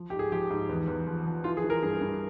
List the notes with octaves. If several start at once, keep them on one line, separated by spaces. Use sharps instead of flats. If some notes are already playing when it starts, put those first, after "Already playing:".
Already playing: F3
G#2 G4
G#4
F3 G4
G#2
E2
E2
F3
F3
E3 F4
G#4
E3
A#4
G2 G#4
G2